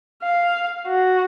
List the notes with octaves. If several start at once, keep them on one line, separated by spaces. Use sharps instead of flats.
F5
F#4